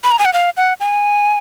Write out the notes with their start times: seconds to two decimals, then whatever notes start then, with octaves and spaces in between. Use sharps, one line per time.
0.04 B5
0.11 A#5
0.19 G#5
0.25 F#5
0.33 F5
0.57 F#5
0.80 G#5